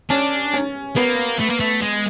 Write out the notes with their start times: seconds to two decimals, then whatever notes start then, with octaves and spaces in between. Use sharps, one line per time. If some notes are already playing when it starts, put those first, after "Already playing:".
0.10 C#4 D4
0.54 C#4
0.96 A#3 B3
1.39 A3
1.49 A#3
1.60 A3
1.82 G#3